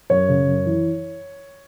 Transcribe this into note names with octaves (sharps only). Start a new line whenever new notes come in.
F#2 C#5
C#3
F#2
E3